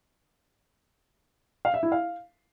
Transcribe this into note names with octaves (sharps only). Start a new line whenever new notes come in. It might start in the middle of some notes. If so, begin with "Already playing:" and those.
F5
E5
E4
F5